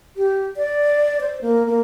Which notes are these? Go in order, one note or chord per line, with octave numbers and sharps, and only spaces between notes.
G4
D5
C5
A#3
A#3